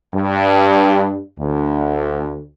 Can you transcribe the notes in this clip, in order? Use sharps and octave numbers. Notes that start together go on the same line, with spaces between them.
G2
D2